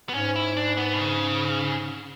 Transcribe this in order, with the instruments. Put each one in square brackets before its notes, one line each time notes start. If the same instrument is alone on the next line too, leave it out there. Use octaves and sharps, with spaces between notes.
[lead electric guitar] B3
[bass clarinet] G#2 [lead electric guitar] C#4
[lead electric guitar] E4
D4
B3
B2
C#3